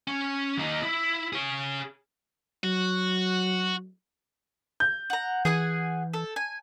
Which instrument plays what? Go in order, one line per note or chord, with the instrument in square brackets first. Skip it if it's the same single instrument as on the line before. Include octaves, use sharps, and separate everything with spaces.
[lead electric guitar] C#4
D#2 D#4
E4
G#4 C#5
[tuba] F#3 [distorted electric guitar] F#4
[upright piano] G6
[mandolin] F#5 A#5
[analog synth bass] E3 [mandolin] G#4 F#5 G#5
[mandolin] A4
G#5